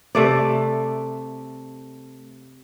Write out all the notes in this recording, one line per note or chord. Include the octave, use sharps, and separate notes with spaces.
C3 A3 D5